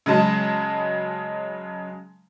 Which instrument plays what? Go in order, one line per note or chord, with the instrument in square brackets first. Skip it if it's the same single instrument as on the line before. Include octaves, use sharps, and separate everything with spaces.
[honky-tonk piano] C#3 F#3 G#3 A5